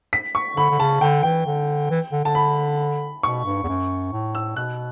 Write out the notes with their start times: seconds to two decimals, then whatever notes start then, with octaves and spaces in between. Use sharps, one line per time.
0.13 B6
0.35 C#6
0.56 D3 B5
0.70 D3
0.79 C#3 A5
1.01 D3 G5
1.23 E3 G5
1.46 D3
1.90 E3
2.12 D3
2.24 D3 A5
2.35 B5
3.23 B2 C#6
3.45 G2
3.64 E2
3.68 F#2
4.12 A2
4.35 E6
4.56 B2 F#6